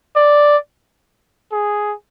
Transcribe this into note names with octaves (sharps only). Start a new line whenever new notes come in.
D5
G#4